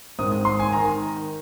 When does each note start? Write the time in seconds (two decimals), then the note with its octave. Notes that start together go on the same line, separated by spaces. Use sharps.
0.19 G#2 D#3 C4 D#6
0.32 D#6
0.45 C6
0.59 G#5
0.72 D#3 A#5